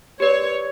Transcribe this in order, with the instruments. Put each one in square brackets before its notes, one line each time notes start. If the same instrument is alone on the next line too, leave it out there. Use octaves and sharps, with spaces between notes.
[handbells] G4 B4 D5 [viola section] C#5